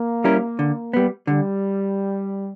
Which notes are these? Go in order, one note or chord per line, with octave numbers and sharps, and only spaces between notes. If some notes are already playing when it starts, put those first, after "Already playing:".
Already playing: A#3
G3 C#4 E4 A#4
D3
G3 B3
D3 G3